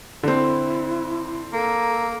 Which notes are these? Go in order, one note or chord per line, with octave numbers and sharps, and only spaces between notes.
D3 C4 E4
A#3 A4